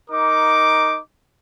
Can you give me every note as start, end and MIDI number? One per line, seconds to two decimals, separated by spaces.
0.10 0.98 63
0.10 0.98 70
0.10 0.98 86